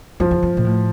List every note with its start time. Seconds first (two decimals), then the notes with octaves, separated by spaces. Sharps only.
0.20 F2 F3
0.31 E2
0.43 F2
0.57 A#2
0.65 A2